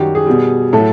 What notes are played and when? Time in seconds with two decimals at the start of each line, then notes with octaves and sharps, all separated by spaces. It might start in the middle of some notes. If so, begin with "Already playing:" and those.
Already playing: F#2 D#3 G3 F#4 G4
0.15 G#4
0.26 B2 G3
0.73 A2 F#3 A3 A4